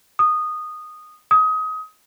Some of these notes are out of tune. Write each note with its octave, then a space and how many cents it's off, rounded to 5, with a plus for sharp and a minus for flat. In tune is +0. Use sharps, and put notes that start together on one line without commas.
D#6 -15
D#6 +25